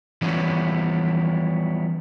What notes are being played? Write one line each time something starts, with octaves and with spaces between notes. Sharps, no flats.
E3 F3 G3 B3 C#4